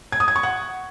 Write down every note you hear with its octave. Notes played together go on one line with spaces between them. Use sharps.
G#6
D#6
G#6
C#6
F#5